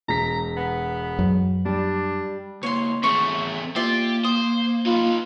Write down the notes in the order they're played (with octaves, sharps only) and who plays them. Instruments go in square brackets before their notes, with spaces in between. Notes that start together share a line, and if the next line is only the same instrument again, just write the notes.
[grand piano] E1 B6 [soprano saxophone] A#5
[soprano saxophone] B3
[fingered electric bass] F#2
[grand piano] G3 [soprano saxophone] D4
[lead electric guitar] C#2 A#3 [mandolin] C#5 C6
[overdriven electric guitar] E2 A3 [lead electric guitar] C4 G#4 [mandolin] C#6
[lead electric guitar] A#3 [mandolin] F4 D5 E5 [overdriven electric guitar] G4
[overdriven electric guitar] C5 [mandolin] D#6
[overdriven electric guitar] D#4 B4 [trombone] F4